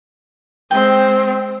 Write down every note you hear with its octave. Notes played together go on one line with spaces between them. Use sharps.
G#3 C4 G5